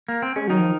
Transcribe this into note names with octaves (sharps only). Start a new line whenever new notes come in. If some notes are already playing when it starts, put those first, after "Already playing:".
A#3
C4
G#3 C#4
D#3 F#3 D#4
F3